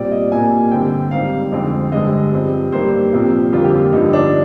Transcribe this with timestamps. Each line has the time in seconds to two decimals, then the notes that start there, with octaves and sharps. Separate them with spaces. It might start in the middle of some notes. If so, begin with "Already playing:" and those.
Already playing: A#2 G3 C4 D5
0.11 D#5
0.31 C2 A#2 G3 A#3 G#5
0.71 G2 D3 G3 C4 G5
1.11 G#2 D#3 G3 C4 F5
1.52 F2 D3 G#3 C4
1.92 G2 D3 G#3 D#5
2.32 G2 F3 C4
2.72 G2 D#3 G3 A#3 C5
3.13 C2 A#2 F3 C4
3.52 F2 D3 G3 A#3 F4
3.64 G4
3.74 F4
3.92 G2 D3 F3 D#4
4.13 D4